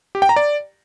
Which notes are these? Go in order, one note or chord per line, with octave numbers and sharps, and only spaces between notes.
G4
G5
A#5
D5